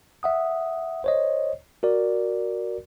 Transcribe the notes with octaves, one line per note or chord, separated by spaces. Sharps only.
E5 F#5 D#6
C5 C#5 D#5
F#4 A#4 D5